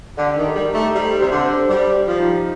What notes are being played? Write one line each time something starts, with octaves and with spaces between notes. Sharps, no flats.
D3 G4
D#3
G4
G3
D#4
A3
G3 C5
C3 C5
D3
C5
G3 G4
G4
F3
D#4